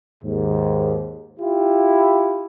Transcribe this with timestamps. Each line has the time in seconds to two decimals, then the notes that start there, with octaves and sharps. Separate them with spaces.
0.24 D#2 G#2
1.40 E4 F4 G4